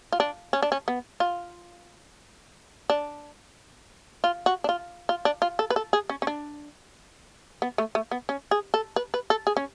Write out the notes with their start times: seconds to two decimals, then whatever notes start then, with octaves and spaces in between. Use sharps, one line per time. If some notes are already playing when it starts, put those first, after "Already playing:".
0.12 F4
0.20 D4
0.53 C#4
0.62 D4
0.72 C#4
0.88 B3
1.20 F4
2.90 D4
4.24 F4
4.46 F#4
4.64 D4
4.69 F4
5.09 F4
5.25 D4
5.42 F4
5.59 A4
5.70 B4
5.76 A4
5.93 G#4
6.09 C#4
6.22 C#4
6.27 D4
7.62 B3
7.78 A3
7.95 A3
8.11 B3
8.29 C#4
8.51 G#4
8.74 A4
8.96 B4
9.14 B4
9.30 A4
9.47 G#4
9.57 C#4